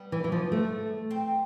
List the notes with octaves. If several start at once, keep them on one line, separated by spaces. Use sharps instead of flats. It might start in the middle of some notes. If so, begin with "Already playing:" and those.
Already playing: G3 B3
E3
E3
F3
A3
C4